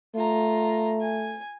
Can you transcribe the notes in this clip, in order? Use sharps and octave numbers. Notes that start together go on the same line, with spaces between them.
A3 F4 A#5
G#5